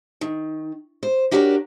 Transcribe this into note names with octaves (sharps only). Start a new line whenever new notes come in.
D#3
C5
D4 F#4 G4 A#4 C5 C#5